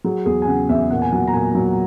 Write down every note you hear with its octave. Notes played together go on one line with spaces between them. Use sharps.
F#3 G#4
E2 G#4
G#5
C#3 F#5
E2 E5
A#2 F#5
G#5
F#3 F#5
A#5
A#2 G#5
F#3